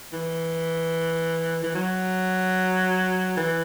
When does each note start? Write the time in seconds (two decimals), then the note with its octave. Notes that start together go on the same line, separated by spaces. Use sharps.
0.13 E3
1.63 E3
1.75 F#3
3.37 E3